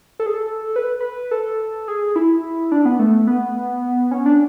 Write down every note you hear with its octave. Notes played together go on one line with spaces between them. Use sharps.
A4
G#4
A4
B4
B4
A4
G#4
E4
D4
B3
A3
B3
C#4
D4